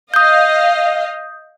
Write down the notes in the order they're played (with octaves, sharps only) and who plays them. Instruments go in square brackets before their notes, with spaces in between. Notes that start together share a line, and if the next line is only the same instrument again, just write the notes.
[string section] D#5 F5 [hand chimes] D#6 G6